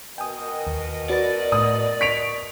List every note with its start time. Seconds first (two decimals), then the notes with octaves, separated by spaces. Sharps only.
0.18 B2 A#4 D#5 G5 G#5 D#6
0.67 D#2
1.10 F#4 B4 D5 A6
1.52 A2 D#6
2.01 C#6 B6 D7 F7